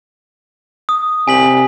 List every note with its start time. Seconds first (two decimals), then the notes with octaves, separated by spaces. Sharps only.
0.89 D#6
1.28 C3 G#5 B6 F#7